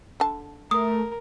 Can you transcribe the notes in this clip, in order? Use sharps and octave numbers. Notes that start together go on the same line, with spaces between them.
D3 A5
A3 A#4 D#6